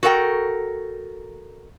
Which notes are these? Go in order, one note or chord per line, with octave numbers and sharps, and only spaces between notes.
F#4 A4 A#4 F#5 G5